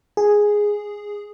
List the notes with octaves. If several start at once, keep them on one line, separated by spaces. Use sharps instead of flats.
G#4